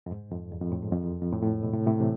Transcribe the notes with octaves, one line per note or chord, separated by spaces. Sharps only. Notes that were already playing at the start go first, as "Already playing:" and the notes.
F2
G#2
F2
E2
F2
A2
G#2
F2
E2
F2
A2
A2
G#2
B2
A2 C3
A2 C3
C3 E3